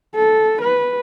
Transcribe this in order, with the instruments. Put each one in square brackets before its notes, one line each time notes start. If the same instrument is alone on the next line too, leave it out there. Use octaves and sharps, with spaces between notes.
[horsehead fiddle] A4
B4